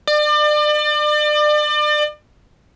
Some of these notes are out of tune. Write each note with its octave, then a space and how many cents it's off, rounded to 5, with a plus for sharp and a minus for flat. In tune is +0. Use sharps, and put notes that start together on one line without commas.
D5 +35